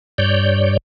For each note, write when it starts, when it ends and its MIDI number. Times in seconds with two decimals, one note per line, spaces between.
0.18 0.77 43
0.18 0.77 73
0.18 0.77 74
0.18 0.77 91